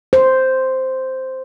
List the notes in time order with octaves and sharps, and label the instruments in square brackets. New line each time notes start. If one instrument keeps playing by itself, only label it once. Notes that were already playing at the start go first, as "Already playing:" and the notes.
[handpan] C5